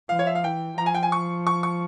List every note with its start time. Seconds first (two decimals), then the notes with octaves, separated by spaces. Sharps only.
0.09 F3 F5
0.19 C#5
0.27 E5
0.35 F5
0.43 E3 G5
0.78 F3 A#5
0.86 G#5
0.94 G5
1.03 G#5
1.12 C#6
1.47 C#6
1.63 C#6